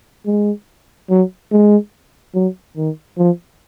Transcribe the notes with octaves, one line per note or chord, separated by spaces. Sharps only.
G#3
F#3
G#3
F#3
D#3
F3